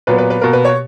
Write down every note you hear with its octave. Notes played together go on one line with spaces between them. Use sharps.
A#2 F#3 B3 B4
B4
B4
B2 A#3 A#4
B4
C#5